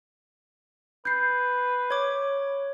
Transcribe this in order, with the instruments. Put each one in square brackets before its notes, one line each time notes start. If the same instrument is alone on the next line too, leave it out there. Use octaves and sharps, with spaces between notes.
[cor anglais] B4 [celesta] G6 C7
[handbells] C#5 D6